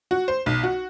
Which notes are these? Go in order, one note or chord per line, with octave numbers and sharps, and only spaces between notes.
F#4
C5
B1
F#4